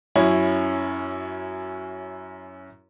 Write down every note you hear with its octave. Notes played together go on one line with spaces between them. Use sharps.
F#2 C#4 E4